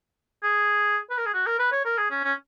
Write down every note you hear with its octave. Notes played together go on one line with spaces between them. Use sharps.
G#4
B4
A#4
G#4
F#4
A#4
B4
C#5
A#4
G#4
C#4
C#4